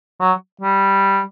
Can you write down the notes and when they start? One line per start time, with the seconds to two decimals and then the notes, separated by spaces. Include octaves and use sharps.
0.20 F#3
0.61 G3